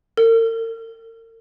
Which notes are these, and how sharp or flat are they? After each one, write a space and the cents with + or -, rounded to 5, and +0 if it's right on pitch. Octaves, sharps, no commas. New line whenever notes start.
A#4 -45